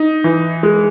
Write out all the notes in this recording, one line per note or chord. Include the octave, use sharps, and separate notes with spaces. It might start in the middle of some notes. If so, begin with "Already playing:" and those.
Already playing: D#4
E3
G#3